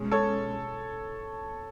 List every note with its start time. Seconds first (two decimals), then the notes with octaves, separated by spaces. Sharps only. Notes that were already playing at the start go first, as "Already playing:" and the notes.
Already playing: B2 G#3 C#4
0.11 A4 C#5